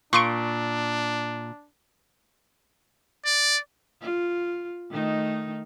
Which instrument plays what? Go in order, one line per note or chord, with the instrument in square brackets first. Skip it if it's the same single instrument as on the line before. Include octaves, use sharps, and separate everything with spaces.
[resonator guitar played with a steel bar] A#2 [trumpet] D4 [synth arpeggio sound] C6 C#6 D7
[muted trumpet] D5
[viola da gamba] F4
D#3 A3 D#4